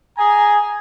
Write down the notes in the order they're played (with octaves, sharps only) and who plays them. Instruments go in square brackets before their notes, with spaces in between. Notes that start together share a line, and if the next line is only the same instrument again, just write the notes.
[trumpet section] G#4 G#5 A#5